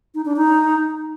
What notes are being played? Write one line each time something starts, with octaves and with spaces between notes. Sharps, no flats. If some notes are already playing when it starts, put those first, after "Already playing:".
D#4
D4
D#4